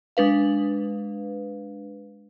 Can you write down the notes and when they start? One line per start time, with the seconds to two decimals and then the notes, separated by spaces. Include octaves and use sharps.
0.17 G#3 D4 B4 F5